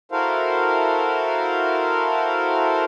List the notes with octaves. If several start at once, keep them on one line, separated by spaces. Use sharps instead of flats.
E4 F#4 A4 A#4 C5 F5